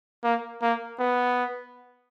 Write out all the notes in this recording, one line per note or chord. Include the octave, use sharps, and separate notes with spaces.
A#3
A#3
B3